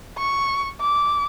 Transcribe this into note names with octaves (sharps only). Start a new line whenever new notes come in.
C#6
D6